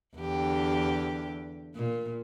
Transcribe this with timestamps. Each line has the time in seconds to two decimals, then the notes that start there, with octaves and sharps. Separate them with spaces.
0.16 E2 D3 G4
1.75 A#2